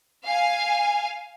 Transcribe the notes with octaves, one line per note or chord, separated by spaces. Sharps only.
F5 G#5